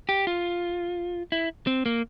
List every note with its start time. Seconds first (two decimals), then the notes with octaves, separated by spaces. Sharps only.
0.09 G4
0.27 F4
1.32 E4
1.67 C4
1.86 A#3